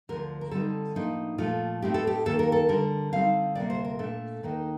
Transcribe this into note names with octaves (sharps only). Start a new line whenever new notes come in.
D2 D3 F3 A#4
A#4
D3 G3 C4 D#4 A4
A2 F3 A#3 D4 D#4
A#2 F3 A3 F4
A2 A3 C4 D#4 G4
A4
G4
D#2 D#3 A#3 A4
A#4
A4
D3 G3 D4 A#4
D3 G3 C4 D#4 F5
D2 C3 G3 A#3 D5
C5
A#4
A#2 A3 D4 A4
D#2 D#3 A#3 D#4